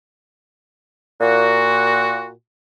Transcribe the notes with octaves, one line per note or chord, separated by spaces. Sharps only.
A#2 F#4